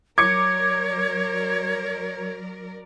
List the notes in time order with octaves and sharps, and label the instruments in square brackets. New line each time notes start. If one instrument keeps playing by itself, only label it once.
[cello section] F#3 A#4 D5 [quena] C#5 [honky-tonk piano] D6 C#7 [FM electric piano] G#6